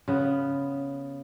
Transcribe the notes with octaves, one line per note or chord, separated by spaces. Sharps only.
C#3 B3